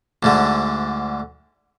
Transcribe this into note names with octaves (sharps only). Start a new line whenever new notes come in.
D2 G#2 D3